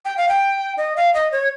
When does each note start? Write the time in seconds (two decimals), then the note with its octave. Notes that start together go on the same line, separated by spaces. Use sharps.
0.05 G5
0.17 F5
0.29 G5
0.77 D#5
0.97 F5
1.14 D#5
1.32 C#5